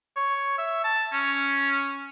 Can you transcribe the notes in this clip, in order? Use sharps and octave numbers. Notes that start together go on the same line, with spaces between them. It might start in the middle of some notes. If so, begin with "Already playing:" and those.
C#5
E5
A5
C#4